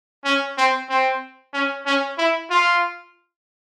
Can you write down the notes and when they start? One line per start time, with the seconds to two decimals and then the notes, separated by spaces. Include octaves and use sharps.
0.24 C#4
0.58 C4
0.89 C4
1.54 C#4
1.86 C#4
2.18 E4
2.50 F4